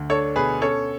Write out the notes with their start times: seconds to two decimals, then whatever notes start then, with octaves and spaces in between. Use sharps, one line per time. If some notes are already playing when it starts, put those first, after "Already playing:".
Already playing: D2
0.10 D4 A4 C#5
0.36 B2 G#4 B4
0.61 C#4 A4 C#5